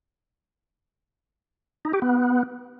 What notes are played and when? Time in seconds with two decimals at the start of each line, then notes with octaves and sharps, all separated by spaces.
1.85 D#4
1.93 G4
2.02 B3